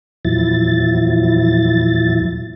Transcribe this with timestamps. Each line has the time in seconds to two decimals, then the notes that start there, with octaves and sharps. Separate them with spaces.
0.25 E2 A#2 F3 F#3 E4 A6